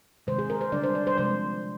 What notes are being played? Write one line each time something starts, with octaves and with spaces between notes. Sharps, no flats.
C3 D#3 G#3 C5
G#4
A#4
C5
D3 G3 D4 D5
C5
D5
C5
C3 F3 G#3 C5